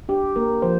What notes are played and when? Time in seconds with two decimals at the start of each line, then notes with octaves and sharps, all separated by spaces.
0.09 D4 G4
0.36 A#3 A#4
0.62 F3 C5